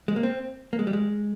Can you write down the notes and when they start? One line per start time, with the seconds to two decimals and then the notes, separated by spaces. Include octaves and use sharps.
0.08 G#3
0.16 A#3
0.23 C4
0.73 A#3
0.79 G#3
0.87 G3
0.93 G#3